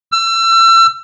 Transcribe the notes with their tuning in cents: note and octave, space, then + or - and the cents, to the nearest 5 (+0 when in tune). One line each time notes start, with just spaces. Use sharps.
E6 +35